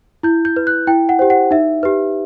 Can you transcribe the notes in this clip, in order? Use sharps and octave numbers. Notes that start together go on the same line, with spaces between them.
E4 G6
G6
B4
F#6
E4 G5
F#5
G4 C5
F#5
D#4 E5
G4 B4